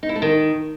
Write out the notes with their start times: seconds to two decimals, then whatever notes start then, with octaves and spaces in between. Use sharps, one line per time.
0.03 D#4
0.09 E4
0.15 A3
0.22 D#3